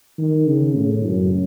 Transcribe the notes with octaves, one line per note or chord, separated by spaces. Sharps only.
D#3
C#3
A2
F#2